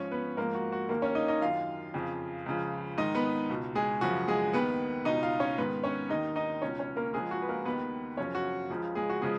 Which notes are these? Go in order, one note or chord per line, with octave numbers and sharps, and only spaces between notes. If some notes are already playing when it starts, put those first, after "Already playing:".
Already playing: G#2 F3 C#4 C#5
B3 B4
G#2 F3 A#3 A#4
F#4
F#4
D#2 D#3 A#3 A#4
C#4 C#5
D#4 D#5
D#4 D#5
F#2 D#3 F4 F5
F2 C#3 F3
C#2 C#3 F3
G#2 D#3 D#4 D#5
B3 B4
C#2 B2
G#3 G#4
F#2 C#3 F3 F#4
G#3 G#4
D#2 D#3 B3 B4
C#2 B2 D#4 D#5
F4 F5
C#4 C#5
G#2 D#3 B3 B4
C#4 C#5
D#2 D#3 D#4 D#5
D#4 D#5
C#2 B2 C#4 C#5
C#4 C#5
A#3 A#4
C#2 C#3 F3 G#3 G#4
F#4
B4
A#3 A#4
D#2 D#3 B3 B4
F#2 C#3 F3 C#4 C#5
F#4
C#2 C#3 F3
G#3 G#4
F#4
C#3 F3 G#3 G#4